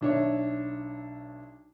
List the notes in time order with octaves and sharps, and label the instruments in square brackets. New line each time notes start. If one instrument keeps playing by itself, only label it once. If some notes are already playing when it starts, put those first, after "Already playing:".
[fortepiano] B1 D4 C#5 E5